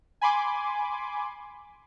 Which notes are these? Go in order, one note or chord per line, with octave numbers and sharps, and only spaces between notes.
G#5 B5 C6 D6